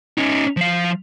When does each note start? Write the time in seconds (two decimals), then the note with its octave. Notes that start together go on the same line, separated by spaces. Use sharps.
0.18 C#4 D#4
0.57 F3 F5